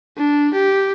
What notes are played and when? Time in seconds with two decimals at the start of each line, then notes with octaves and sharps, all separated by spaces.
0.17 D4
0.53 G4